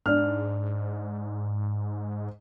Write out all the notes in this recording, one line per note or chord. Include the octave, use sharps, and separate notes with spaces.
G#2 D4 F6